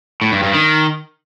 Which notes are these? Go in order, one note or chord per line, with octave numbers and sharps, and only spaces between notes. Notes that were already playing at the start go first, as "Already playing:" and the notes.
A2
G2
G2
D#3